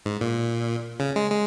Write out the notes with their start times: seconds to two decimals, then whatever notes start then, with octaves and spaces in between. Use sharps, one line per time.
0.06 G#2
0.21 A#2
1.00 C#3
1.16 G#3
1.31 G#3